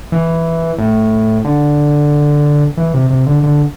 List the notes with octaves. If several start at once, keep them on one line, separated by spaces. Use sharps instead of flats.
E3
A2
D3
E3
C3
C3
D3
D3